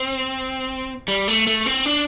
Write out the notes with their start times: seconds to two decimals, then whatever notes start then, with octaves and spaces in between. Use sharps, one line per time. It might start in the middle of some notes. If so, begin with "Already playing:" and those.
Already playing: C4
1.08 G3
1.28 A3
1.47 A3
1.66 C4
1.86 D4